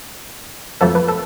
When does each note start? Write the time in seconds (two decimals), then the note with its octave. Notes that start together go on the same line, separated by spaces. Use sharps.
0.81 F2 F3 A3 A4
0.95 B4
1.09 A4